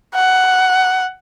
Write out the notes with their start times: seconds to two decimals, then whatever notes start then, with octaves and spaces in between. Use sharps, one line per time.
0.15 F#5